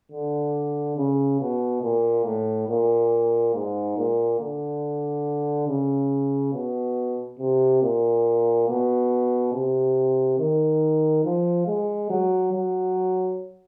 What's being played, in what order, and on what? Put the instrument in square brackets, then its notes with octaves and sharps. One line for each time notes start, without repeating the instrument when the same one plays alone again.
[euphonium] D3
C#3
B2
A#2
A2
A#2
G#2
A#2
D3
C#3
B2
C3
A#2
B2
C3
D#3
F3
G#3
F#3
F#3